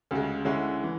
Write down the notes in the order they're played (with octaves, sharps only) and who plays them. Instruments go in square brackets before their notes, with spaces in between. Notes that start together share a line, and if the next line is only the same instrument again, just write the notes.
[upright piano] D2 C#3 G#3
D3 G#3 C#4 E4
E3